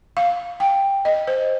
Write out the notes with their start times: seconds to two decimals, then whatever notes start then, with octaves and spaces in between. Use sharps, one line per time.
0.17 F5
0.60 G5
1.05 D#5
1.27 C5